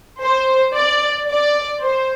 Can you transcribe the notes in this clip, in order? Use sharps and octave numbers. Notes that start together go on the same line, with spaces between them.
C5
D5
D5
C5